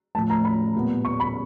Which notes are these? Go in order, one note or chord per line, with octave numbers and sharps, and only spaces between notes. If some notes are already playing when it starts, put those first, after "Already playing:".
A2 F3 A3 A5
A#5
B5
A#2 G3 B3
C#6
B5